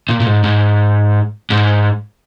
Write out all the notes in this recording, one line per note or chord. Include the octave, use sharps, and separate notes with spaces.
A#2
A#2
G#2
G#2
G#2